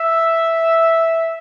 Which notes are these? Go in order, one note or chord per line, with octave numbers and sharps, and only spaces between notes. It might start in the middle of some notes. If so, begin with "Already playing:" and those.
Already playing: E5